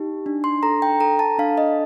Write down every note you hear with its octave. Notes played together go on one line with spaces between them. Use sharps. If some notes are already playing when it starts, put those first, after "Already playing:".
Already playing: D#4 G4
D4
C6
A4 A#5
G5
A4 A#5
A5
D4 F5
D#5